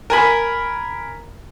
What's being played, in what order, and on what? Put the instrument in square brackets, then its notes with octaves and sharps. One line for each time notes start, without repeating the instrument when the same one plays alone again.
[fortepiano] A#4 G#5 B5